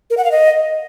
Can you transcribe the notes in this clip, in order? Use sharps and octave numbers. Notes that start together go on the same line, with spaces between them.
A#4
F#5
F5
D#5